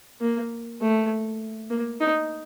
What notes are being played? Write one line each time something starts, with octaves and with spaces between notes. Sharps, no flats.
A#3
A3
A#3
D#4